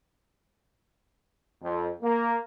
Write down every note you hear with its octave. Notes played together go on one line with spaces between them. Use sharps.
F2
A#3